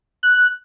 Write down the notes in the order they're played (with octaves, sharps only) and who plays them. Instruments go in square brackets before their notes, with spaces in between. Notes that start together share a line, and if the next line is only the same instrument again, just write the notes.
[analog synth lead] F#6